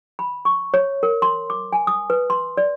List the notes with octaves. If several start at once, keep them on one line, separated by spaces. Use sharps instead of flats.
B5
C#6
C#5
A#4
C6
D6
G#5
D#6
B4
C6
D5